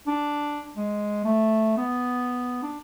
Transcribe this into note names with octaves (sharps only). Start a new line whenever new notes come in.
D4
G#3
A3
B3
D4